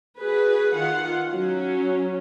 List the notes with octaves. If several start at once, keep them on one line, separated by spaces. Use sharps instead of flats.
F#4 G#4 B4
D#3 F4 F#5
F#3 C#4